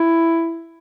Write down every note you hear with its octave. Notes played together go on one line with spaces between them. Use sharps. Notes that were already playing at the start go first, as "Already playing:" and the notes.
Already playing: E4